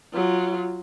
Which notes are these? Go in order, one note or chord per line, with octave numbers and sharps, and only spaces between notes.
F#3 F4